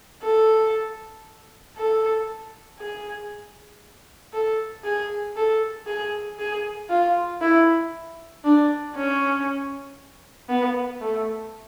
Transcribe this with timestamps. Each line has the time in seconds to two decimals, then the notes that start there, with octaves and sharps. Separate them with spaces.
0.23 A4
1.76 A4
2.79 G#4
4.33 A4
4.84 G#4
5.36 A4
5.87 G#4
6.39 G#4
6.90 F4
7.41 E4
8.44 D4
8.96 C#4
10.49 B3
11.01 A3